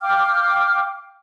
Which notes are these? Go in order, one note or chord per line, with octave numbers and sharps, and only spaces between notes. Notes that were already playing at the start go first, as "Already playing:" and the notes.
F5 G5 D6 F6